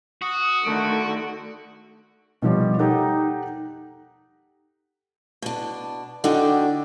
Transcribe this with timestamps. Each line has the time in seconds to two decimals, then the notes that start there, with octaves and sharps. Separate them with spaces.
0.22 F#4 D#6
0.65 D3 D#3 A3 D7
2.42 B2 F3 G3 C#5
2.79 D#4 G4 A4 F#5
5.42 B2 D4
6.24 D3 D#4 F#4 G5